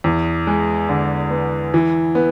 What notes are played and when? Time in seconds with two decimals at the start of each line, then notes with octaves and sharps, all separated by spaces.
0.04 E2
0.47 G#3
0.89 D3
1.31 B3
1.74 E3
2.15 B3